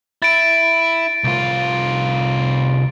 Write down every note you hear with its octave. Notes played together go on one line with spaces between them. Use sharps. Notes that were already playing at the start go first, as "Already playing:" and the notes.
E4 A6 D7
C2 F4